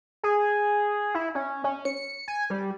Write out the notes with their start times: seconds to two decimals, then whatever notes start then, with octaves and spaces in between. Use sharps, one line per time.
0.23 G#4
1.15 E4
1.35 C#4
1.64 C#4
1.85 C#7
2.28 G#5
2.50 G3